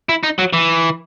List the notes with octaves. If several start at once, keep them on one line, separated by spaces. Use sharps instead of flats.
E4
D#4
F#3
E3